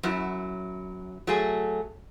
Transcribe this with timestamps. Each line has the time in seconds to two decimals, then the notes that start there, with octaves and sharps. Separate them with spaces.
0.03 F#2 F#3 E4
1.27 F#3 A3 G#4